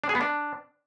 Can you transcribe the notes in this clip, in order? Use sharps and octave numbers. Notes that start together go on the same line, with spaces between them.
D4
G#4
B3
D4